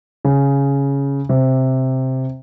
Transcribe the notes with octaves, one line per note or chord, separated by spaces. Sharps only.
C#3
C3